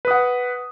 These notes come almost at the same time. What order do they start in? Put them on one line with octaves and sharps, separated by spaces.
B4 D#6 F#5